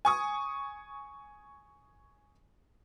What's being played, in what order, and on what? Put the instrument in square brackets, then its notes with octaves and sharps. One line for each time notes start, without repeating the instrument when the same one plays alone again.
[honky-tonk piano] G#5 C#6 D#6